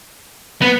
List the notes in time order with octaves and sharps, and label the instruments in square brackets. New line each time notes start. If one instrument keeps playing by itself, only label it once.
[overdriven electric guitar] B3